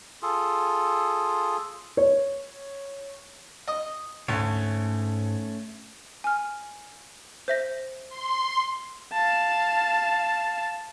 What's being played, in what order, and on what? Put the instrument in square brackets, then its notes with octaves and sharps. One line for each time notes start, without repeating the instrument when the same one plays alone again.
[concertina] F4 G#4 A4
[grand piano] C#5
[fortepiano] D#5
[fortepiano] D2 [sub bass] G#2 [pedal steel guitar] A3 C#4 C#5
[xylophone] G#5 F6
C5 E5 A#6
[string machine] C6
[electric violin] F5 A5